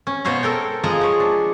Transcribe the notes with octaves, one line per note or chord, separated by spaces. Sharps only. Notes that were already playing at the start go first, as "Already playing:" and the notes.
C#4
B2 C5 C#5 F5 A#5
A4 A#4 G5
F3 G#3 F4 G#5 A#5
F3 C#5
D4